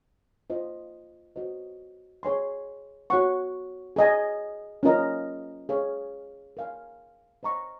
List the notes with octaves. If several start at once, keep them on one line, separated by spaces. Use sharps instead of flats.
F4 C5 D#5
F#4 C5 D#5
G#4 C#5 G#5 C6
F#4 C#5 F#5 C#6
G#4 D#5 G#5
C#4 F4 A#4 D#5 A#5
G#4 C#5 F5
A#4 F5 G#5
C5 D#5 A#5 C#6